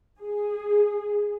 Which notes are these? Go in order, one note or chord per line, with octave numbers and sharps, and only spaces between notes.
G#4